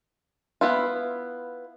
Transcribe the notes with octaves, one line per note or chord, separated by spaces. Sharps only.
B3 E4 F4